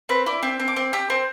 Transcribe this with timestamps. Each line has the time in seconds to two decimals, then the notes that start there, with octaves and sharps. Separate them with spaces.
0.09 C4 B4
0.26 E4 D5
0.43 C4 E5
0.60 C4
0.68 D6
0.76 C4
0.93 G4 E6
1.10 C4